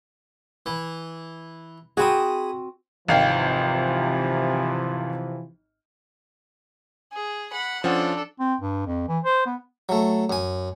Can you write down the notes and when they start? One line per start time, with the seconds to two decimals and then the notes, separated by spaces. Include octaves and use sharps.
0.66 E3
1.97 C4 F#4 G#4 B5 D#6
3.08 G#1 C3 E3 F3 F5 G5
7.13 G#4
7.52 F#5 B5
7.84 F3 C#4 D4 A4 F#5
8.40 C4
8.61 G2
8.87 F2
9.08 E3
9.24 C5
9.46 B3
9.89 F#3 A3
10.30 F#2 G#5